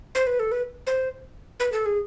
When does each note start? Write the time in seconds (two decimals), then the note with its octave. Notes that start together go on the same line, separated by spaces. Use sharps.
0.15 C5
0.27 B4
0.40 A4
0.52 B4
0.87 C5
1.60 B4
1.72 A4
1.86 G#4